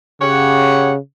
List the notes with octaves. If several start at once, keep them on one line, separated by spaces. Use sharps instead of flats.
C#3 G4 C#5 F#5